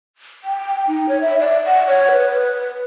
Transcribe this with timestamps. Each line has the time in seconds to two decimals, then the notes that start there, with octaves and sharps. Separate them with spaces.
0.44 G5
0.88 D#4
1.09 C#5
1.21 E5
1.40 D5
1.67 F#5
1.87 C#5
2.12 B4